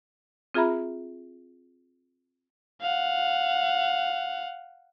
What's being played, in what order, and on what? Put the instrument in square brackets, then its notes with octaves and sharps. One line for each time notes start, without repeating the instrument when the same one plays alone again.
[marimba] C4 F4 G#4 E5 A#5 B5
[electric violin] F5 F#5